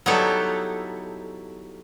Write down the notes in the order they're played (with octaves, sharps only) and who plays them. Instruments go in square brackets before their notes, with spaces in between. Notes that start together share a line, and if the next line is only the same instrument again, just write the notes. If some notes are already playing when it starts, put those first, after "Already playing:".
[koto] F#3 G3 B3 D#4 E4 A4